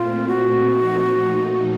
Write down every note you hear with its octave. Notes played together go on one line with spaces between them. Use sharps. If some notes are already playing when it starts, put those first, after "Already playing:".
Already playing: A#2 A3 C4 F4
F#4
A#2 F3 A3 D#4